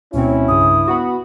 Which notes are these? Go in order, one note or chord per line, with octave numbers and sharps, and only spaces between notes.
D2 B2 C4 C#4 E4 C#5
C2 G2 C#3 D#6
B3 F#4 F#5 B5